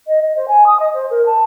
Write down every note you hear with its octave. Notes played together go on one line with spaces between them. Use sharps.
D#5
D#5
C5
G#5
D#6
D#5
C5
A#4
A5